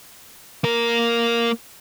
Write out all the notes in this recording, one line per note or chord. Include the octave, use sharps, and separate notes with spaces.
A#3 A#4